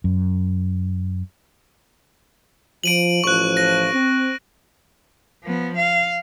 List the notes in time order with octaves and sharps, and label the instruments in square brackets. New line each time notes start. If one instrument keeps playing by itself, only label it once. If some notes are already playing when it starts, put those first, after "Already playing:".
[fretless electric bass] F#2
[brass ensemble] F3 [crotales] D7 D#7 F#7
[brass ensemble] A1 F3 [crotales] C#6 F#6
[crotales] A#6
[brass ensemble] C4
[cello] F3 B3
F5